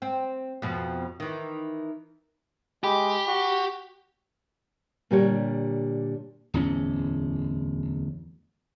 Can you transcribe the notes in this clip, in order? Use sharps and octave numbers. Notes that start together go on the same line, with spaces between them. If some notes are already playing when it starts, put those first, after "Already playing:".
C4
F2 B2 F3
D#3 E3
G#3 G4 G5 B5 D6
F#4
A#2 D3 G3 G4 A#4 C#5
D1 E2 C#4